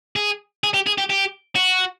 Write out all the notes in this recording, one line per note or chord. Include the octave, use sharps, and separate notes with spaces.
G#4
G#4
G4
G#4
G4
G4
F#4